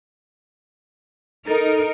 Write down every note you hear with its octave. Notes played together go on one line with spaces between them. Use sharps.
D#4 A4 A#4